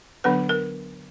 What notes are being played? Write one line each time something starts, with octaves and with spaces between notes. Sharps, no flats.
D3 F#3 B3 D4 B4
A#4